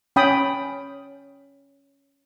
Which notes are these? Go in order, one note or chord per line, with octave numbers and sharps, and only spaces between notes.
C#4 G5 B5 D#6